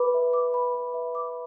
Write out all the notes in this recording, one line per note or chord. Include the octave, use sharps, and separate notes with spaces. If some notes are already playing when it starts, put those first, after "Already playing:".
Already playing: B4 B5 D6
E5
D6
B5
B4
E5
D6